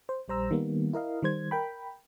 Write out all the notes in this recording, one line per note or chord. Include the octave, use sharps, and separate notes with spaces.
C5
A#1 G3 C5 A#5 E6
D#3 G3 A#3 B3
E4 A#4 D#5 F5
D#3 G3 C5 G#6
A#4 G5 B5